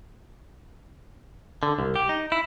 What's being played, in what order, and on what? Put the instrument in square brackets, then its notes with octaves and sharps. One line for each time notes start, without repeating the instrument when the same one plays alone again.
[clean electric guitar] D3
C2
G4
D#4
E4